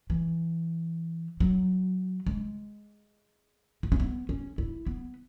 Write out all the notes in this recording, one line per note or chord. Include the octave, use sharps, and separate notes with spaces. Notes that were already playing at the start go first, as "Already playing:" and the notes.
E3
F#3
G#3
E4
C#4
B3
C#4
E4
B3